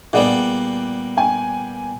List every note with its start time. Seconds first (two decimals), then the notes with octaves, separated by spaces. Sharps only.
0.13 A#2 G3 B3 G#4 D5 F#5
1.17 G5 G#5